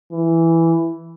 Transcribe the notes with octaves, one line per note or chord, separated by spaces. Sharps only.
E3